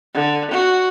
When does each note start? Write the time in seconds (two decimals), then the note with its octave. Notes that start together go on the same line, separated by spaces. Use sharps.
0.15 D3
0.51 F#4